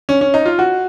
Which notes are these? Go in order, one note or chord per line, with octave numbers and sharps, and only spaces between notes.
C#4
C#4
D#4
F4
F#4